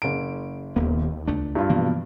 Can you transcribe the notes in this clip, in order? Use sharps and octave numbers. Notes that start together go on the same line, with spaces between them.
F#1 D7
D#1 D#2 A#3 B3
C#2 A3 D4
G2 E4 F4
B2 E3 F3 A#3